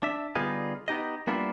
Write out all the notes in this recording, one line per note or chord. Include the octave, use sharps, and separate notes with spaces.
D4 E5
D3 G3 B3 D#4 F4 G#4
B3 D#4 G4 D#5
G3 A#3 B3 D4 E4 F4